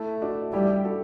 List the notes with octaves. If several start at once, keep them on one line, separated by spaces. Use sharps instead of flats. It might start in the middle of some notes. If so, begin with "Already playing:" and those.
Already playing: A3 E4
D4 F#4
G3 E4 G4
F#4 A4